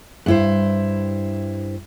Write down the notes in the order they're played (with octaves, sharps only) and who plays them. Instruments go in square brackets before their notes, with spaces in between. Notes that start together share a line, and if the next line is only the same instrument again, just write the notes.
[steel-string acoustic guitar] G2 E4 C5